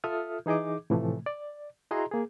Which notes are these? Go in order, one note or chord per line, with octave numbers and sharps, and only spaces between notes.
F4 A4 E5 D#6 F6
E3 D#4 G#4 D#5 D6
A2 C3 E3 F3 A3
D5
E4 F#4 G#4 D#5 A#5 C6
A#3 G#4